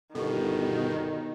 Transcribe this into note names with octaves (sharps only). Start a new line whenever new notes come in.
G1 B2 D#3 G4 A4